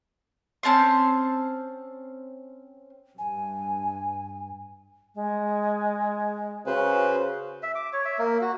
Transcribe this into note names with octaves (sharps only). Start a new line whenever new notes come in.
C4 C#4 A5 C6
G2 G#5
G#3
C#3 F#4 B4 C5
E5
D6
C#5
E5
A#3
F#4